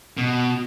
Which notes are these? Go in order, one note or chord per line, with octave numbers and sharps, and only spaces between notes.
B2